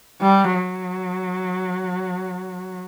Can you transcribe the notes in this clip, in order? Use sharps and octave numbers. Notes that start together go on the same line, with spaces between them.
G3
F#3